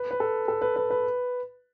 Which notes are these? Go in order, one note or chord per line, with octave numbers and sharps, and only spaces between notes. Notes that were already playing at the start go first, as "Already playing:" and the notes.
Already playing: B4
B4
A4
A4
B4
B4
B4